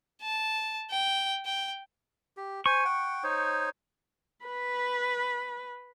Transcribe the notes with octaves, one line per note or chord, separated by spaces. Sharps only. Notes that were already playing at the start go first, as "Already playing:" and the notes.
A5
G5
G5
G4
C5 G#5 C#6
F#5 G5
D#4 C5 C#5
B4 B5